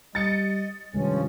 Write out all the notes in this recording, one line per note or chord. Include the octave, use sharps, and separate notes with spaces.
G3 D#5 A6 C#7
G2 C3 D#3 F3 G#3 C#4